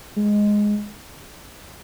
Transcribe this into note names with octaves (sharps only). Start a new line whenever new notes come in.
G#3